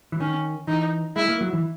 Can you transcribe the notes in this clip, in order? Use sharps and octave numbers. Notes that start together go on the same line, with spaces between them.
E3
D#3 C#4
E3 D#4
G#3 E4
A#3
F#3
E3